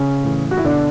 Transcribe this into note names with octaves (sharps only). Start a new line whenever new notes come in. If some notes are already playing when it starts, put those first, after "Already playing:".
Already playing: C#3 C#4
A2 E3
F#4
E4
B2 D3 D4